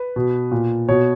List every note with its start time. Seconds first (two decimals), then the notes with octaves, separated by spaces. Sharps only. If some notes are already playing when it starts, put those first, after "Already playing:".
Already playing: B4
0.16 B2
0.52 A#2
0.88 B2 C#5